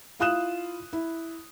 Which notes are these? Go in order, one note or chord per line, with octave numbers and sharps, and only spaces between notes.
E4 F4 F5 D#6 F#6 E7
E4